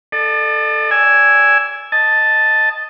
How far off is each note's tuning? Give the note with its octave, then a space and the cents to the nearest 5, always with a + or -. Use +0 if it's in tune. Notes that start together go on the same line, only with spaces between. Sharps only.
A4 +0 D5 +40
D5 -25 G#5 +0 E6 +0
D#5 +0 A5 +0